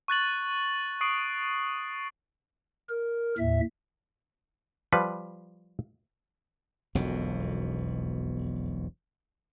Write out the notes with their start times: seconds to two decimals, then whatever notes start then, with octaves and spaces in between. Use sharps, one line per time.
0.08 C#6 F#6 A6 F#7
1.01 C#6 D#6 C7 D7 F#7
2.89 A#4
3.38 D#2 A2 E5
4.93 F3 G3 B4
6.95 E1 B1 F2 B2